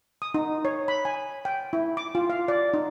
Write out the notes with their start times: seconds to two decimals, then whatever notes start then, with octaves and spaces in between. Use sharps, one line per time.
0.22 D#6
0.34 D#4
0.65 C#5
0.88 B5
1.05 G#5
1.45 G5
1.73 E4
1.97 D6
2.15 F4
2.30 F5
2.48 D5
2.74 D#4